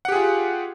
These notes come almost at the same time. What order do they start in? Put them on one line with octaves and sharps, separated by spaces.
F#5 G4 G#4 F4